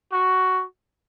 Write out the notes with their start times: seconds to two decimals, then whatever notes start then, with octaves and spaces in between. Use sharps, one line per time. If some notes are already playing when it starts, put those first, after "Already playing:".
0.13 F#4